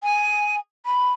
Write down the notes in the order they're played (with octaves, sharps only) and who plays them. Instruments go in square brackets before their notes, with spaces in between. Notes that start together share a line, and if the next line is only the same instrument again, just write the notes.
[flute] G#5
B5